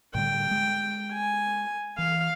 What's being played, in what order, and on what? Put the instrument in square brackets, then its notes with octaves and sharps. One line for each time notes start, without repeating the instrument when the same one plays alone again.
[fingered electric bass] A2 D3 G3 [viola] G5
[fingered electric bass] G#3
[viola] G#5
[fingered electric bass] E3 [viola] F5